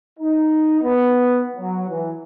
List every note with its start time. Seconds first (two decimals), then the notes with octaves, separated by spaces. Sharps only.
0.19 D#4
0.81 B3
1.56 F#3
1.89 E3